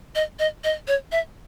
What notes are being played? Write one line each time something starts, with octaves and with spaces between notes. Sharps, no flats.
D#5
D#5
D#5
C#5
E5